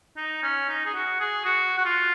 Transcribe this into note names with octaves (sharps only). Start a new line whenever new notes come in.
D#4
C#4
D#4
G#4
F#4
G#4
F#4
F#4
F4